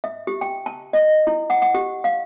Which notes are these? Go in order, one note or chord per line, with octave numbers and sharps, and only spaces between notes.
E5
G4
G5
A5
D#5
E4
F#5
F#5
G4
F5